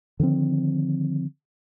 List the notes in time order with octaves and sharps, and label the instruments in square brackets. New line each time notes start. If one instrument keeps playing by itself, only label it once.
[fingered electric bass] D3 D#3 F3 C4